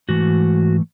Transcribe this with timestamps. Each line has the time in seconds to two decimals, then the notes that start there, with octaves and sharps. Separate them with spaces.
0.08 G#2 E3 A3 F#4